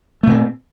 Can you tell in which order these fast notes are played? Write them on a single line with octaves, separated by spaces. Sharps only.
A3 A#2 C4